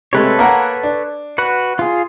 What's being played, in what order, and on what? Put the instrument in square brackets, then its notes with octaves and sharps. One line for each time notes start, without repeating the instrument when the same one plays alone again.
[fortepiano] C3 G#3 A3 [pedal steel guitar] A4 B4 C#5
[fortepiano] A#3 A#4 F#5
D4
[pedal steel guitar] F#4 B4 F#5
F4 G#4